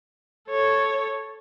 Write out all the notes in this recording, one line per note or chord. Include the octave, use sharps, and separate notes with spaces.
A4 C#5